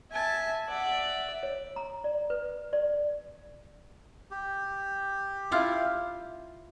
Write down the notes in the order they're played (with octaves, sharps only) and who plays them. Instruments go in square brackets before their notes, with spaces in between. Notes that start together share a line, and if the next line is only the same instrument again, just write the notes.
[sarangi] E5 [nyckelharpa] G#5 A5
[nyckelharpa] D5 E5 [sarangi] F#5
[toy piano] C#5
A#5
D5
B4
D5
[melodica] G4
[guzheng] E4 F4 F5